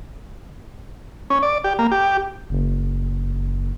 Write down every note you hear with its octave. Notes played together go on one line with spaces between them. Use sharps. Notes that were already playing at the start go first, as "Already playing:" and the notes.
C#4
D5
G4
A#3
G4
F#1